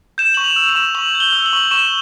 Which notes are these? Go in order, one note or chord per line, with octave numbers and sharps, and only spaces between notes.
G6 E7
C#6 F#7
F7
E6
F7
E7
C#6
C#6 F#7
G6
G7
E6
F#7
C#6
C#6 E7